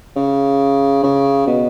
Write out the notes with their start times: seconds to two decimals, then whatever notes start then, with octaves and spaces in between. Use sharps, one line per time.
0.16 C#3
1.03 C#3
1.47 B2